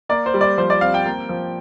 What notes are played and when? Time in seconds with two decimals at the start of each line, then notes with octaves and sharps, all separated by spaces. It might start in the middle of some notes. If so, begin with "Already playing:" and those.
0.09 A#3 D5
0.26 C5
0.34 G3
0.41 D5
0.58 F3 C5
0.70 D5
0.81 C4 F5
0.94 G5
1.06 A#3
1.29 F3